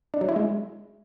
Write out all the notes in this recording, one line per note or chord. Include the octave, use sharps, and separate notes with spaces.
D4
F#3
E4
G#3